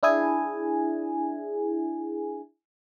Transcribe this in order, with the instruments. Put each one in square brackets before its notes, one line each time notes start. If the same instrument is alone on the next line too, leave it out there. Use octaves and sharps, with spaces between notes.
[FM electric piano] D4 E4 G#4 G#5